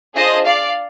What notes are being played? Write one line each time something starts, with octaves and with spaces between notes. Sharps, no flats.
D4 F4 G#4 C5 D#5
D5 F5